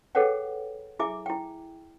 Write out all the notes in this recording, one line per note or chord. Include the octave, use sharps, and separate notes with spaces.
G#4 A4 B4 C#5 F#5 G5
E4 G#4 E5 G#5 D6
E4 G5